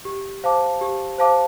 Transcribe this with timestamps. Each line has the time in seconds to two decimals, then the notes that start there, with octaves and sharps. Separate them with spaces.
0.05 G4
0.44 C5 F5 A5 D6
0.81 G4
1.18 C5 F5 A5 D6